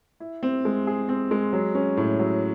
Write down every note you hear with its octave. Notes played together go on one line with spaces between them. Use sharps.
E4
C4
G#3
G#4
C4
G#3
F#3
C#4
A2
F#3